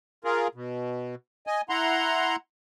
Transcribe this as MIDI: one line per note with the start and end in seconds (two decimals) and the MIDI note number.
0.24 0.48 65
0.24 0.48 68
0.24 0.48 70
0.55 1.15 47
1.47 1.61 75
1.47 1.61 80
1.69 2.36 64
1.69 2.36 78
1.69 2.36 82
1.69 2.36 84